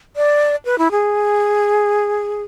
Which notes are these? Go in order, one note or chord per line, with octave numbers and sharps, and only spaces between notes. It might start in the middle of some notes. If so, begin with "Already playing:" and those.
D5
B4
E4
G#4